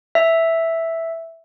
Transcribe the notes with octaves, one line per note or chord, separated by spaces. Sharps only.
E5